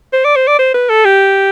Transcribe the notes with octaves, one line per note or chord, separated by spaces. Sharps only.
C5
D5
C5
D5
C5
B4
A4
G4